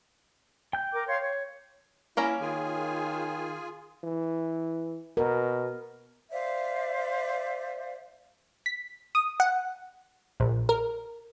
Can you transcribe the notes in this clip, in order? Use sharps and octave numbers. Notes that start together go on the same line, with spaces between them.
G5 G6
A#4 D6
C#5 F5 C6
C#5
A#3 C#4 E4 A#5
D#3 F4 G#4 G#5
E3
B2 A#4
C5 D5 E5 F5
B6
D#6
F#5
A#1
A#4